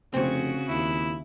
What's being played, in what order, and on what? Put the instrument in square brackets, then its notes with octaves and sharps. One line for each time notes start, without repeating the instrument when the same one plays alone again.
[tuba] F1 [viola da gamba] C#3 F#4 [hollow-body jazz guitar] C4
[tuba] D#2 [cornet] E4